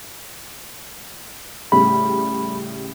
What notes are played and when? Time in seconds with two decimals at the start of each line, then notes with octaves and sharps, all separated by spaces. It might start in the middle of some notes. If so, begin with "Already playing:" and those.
1.72 A2 C#3 G3 B5